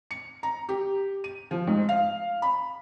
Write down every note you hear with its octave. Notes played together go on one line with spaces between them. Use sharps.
C#7
A#5
G4
D#7
F3
G#2
F5
B5